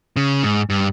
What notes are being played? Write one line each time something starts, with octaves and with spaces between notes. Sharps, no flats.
C#3
G#2
G2